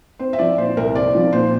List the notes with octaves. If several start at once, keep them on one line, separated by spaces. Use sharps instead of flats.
C4 C5
E5
F3 D5
A#2 C5
C2 A#4
C4 D5
F3
A#2 C5